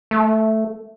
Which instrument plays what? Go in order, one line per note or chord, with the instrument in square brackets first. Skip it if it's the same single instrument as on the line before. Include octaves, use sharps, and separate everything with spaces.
[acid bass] A3